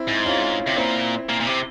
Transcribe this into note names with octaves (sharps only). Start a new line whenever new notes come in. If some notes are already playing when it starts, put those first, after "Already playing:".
Already playing: C4 E4
G#2
C#4 F4
C3
A#2 C4 E4
A#2
A#2
C3